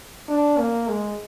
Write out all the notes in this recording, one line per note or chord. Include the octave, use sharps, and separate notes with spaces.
D4
A#3
G#3